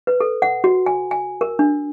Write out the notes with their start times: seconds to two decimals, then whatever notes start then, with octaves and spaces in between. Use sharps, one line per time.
0.07 B4
0.20 A4
0.42 F#5
0.64 F#4
0.86 G#5
1.11 G#5
1.41 A#4
1.59 D4